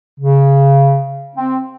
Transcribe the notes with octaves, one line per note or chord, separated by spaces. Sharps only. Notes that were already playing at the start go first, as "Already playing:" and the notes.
C#3
C4